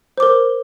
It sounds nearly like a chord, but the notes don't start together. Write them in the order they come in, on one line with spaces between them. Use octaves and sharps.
C5 D6 A#4